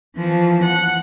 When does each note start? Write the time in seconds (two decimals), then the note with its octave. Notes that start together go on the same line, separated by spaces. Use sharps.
0.16 E3 F3
0.63 F#5